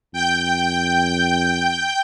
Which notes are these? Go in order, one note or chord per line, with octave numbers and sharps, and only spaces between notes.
F2 G5 G6